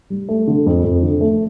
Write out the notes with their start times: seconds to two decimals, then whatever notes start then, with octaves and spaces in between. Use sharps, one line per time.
0.10 G3
0.29 A3
0.48 D3
0.66 F2
0.84 F2
1.03 D3
1.21 A3